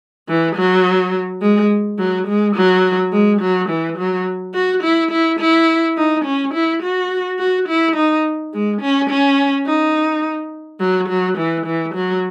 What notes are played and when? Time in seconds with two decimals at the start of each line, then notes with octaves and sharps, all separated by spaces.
0.28 E3
0.56 F#3
1.42 G#3
1.99 F#3
2.27 G#3
2.56 F#3
3.12 G#3
3.41 F#3
3.69 E3
3.98 F#3
4.54 F#4
4.83 E4
5.11 E4
5.40 E4
5.97 D#4
6.25 C#4
6.54 E4
6.82 F#4
7.39 F#4
7.68 E4
7.96 D#4
8.54 G#3
8.81 C#4
9.10 C#4
9.66 D#4
10.80 F#3
11.09 F#3
11.38 E3
11.66 E3
11.94 F#3